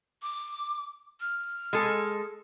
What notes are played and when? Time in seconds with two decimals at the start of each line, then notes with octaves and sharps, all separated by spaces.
0.22 D6
1.20 F6
1.73 G#3 A4